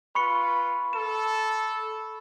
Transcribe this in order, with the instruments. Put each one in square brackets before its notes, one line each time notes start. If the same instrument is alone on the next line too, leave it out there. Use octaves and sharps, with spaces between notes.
[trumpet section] F4 B4 [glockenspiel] B5 C#6 C#7
[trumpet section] A4 [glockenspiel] E7